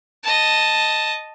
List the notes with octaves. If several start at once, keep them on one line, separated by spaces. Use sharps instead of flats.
D#5 A5